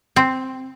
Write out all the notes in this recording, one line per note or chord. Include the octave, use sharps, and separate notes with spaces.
C4